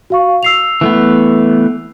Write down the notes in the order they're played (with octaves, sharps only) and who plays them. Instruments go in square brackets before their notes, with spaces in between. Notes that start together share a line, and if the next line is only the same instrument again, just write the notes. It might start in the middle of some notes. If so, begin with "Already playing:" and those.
[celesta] F#4 F5 C#6
E6 C7 F7
[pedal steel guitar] E3 A3 B3